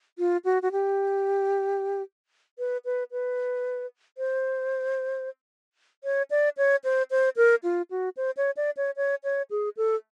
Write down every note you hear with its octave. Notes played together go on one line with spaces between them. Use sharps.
F4
F#4
F#4
G4
B4
B4
B4
C5
C#5
D5
C#5
C5
C5
A#4
F4
F#4
C5
C#5
D5
C#5
C#5
C#5
G#4
A4